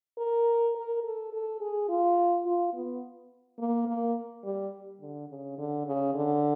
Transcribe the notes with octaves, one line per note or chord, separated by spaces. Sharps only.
A#4
A#4
A4
A4
G#4
F4
F4
B3
A#3
A#3
G3
D3
C#3
D3
C#3
D3